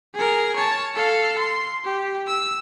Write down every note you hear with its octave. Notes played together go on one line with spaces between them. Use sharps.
G#4 A#4
C#5 A5
A4 F5
C6
G4
E6